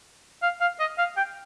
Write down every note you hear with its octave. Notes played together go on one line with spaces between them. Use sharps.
F5
F5
D#5
F5
G5